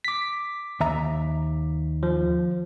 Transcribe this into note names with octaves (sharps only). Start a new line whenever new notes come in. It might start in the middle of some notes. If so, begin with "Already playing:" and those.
D6 B6
D#2 E5 A#5
F3